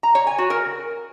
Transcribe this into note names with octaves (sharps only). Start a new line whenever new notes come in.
A#5
C#5
G#5
F#4
A#4